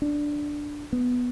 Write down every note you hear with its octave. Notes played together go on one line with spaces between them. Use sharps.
D4
B3